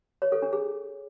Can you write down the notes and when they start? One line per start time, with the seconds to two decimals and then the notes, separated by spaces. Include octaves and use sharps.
0.22 C#5
0.32 A4
0.42 D4
0.53 G#4